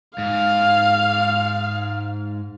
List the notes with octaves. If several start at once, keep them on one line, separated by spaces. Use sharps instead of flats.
G#2 F5